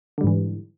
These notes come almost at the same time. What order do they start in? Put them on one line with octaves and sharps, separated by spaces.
D3 G3 G#2 E3